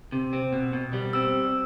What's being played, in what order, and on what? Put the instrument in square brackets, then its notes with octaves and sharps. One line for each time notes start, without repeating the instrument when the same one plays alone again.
[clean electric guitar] C3
C4
B2
B2
G3
[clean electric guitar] C4 [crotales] E6